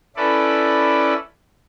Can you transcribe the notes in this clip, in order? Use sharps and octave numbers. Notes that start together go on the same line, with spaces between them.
C#4 E4 A4 B4 D5